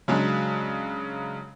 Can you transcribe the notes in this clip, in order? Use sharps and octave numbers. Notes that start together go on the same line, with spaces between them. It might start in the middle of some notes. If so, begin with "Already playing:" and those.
C#3 F#3 G#3 D4